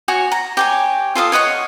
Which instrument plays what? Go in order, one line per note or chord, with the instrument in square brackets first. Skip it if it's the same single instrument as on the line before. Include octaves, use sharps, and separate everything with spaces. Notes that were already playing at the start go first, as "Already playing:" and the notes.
[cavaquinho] F#4 C#5 G#5 C#6
A#5
G4 C#5 G#5
F4 A4 F5 D#6
C#5 D#5 F#5 C#6